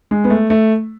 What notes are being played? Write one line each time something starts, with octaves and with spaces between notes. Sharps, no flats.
G#3
B3
A3
A3